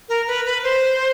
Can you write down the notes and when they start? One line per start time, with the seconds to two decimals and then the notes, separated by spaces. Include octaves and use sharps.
0.09 A#4
0.28 B4
0.46 B4
0.64 C5